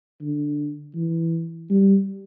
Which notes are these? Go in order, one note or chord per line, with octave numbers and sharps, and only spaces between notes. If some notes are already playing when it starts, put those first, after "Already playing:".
D3
E3
G3